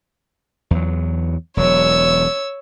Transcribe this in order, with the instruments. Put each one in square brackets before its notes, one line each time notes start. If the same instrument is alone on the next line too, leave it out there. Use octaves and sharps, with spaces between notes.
[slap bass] E2 F#3
[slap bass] E1 F#3 [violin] C#5 E6